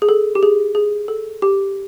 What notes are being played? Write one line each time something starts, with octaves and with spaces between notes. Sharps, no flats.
G#4
A4
G4
G#4
G#4
A4
G4